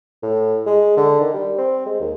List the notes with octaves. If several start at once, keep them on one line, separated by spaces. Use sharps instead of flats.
A2
G#3
D3
D#3
G3
C4
G#3
D#2